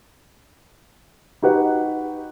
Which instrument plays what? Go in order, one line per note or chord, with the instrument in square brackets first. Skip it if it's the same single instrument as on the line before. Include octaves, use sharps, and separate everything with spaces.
[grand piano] D#4 F#4 G4 B4 F#5